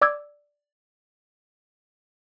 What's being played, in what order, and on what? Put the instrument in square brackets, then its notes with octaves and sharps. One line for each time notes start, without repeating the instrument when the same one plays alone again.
[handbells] D5 D6 E6 G#6